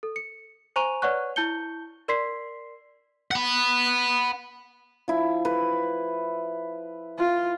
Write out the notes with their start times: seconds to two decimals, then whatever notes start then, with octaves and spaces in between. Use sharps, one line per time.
0.03 A4
0.16 C#7
0.76 C5 G#5 A#5 C#6 D#7 F7
1.02 B4 C#5 D5 F#5 C#6 F#6
1.36 E4 A5 G6 C#7 G7
2.08 A#4 D5 C6 B6 C7
3.31 F#5 B5
5.08 F3 E4
5.45 B4
7.18 F4